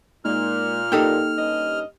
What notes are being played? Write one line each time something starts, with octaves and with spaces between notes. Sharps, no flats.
A#2 G#3 A#3 D#4 F6
A#3 D#4 G4 A4 G5
G2 C#4 D#5